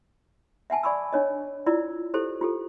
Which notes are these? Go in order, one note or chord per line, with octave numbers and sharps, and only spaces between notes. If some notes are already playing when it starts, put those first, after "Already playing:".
E5 F#5 G#5 A5
D5 G#5 B5 C#6 D6 E6
D4 C#5 D#5
E4 F4 D5 E6
E4 G4 A4 C5
F4 G4 A4